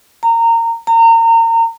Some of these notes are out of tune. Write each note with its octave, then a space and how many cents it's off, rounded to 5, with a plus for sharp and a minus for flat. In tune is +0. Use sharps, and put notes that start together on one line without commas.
A#5 -20
A#5 -30